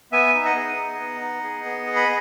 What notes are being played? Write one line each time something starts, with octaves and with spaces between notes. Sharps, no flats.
B3 E5 G#5
D#4
D#5 F#5
G#4
D#4
B3
D#4
G#4
B3
G#4
B5